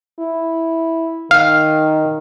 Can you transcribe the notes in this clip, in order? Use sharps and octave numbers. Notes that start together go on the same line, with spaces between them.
E4
D#3 F5